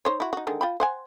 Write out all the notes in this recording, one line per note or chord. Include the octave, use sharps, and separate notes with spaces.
D#4 C5 C#5
E4 F#4
D#4 F#4
D3 D#3 G#3
F4 G5 B5
C5 F#5 G#5